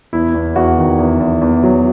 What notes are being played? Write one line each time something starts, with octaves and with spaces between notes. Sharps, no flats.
E2 E4
E2
E2 F#4
D#3
E2
E2
E2
F#3